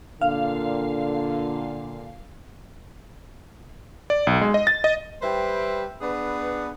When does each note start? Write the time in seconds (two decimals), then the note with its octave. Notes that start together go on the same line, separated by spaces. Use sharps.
0.21 A#2 D3 F5
4.10 D5
4.27 B1
4.41 G#3
4.54 D#5
4.67 A6
4.84 D#5
5.22 G3 B4 C5 E5 G5
6.01 B3 D4 G#4 B4